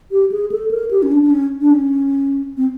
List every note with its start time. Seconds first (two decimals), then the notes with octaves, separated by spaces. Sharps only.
0.11 G4
0.32 G#4
0.52 A4
0.71 A#4
0.91 G4
1.03 C#4
1.12 D4
1.22 D4
1.31 C#4
1.61 D4
1.71 C#4
2.57 C4